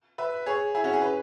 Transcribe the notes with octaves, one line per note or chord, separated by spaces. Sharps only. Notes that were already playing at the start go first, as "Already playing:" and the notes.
B4 E5
G#4 C#5
E4 G#4
C#4 F#4
G#4
B4